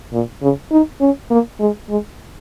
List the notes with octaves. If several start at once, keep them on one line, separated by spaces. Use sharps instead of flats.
A#2
C#3
D#4
C#4
A#3
G#3
G#3